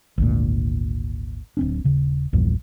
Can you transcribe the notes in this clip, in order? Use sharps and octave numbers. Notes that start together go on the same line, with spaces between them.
G#1 D2 A#2
D1 C4 D4
D#1 C#3
A#1 E2 G2 A#2